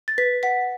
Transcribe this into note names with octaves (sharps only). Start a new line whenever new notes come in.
A6
B4 B6
F#5 B6